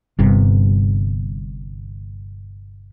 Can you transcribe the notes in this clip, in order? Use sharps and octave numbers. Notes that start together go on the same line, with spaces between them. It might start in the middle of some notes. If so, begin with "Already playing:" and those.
G1 G2 C3